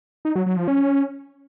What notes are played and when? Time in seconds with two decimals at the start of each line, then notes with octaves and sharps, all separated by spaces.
0.25 D#4
0.36 F#3
0.46 F#3
0.57 F3
0.68 C#4